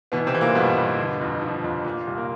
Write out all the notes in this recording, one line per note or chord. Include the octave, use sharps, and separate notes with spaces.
B2 E3 B3
C3 C4
E3
A#2 A#3
G2 B2 B3
G2
D3
F2
F3
F2
A#2
C2
A#3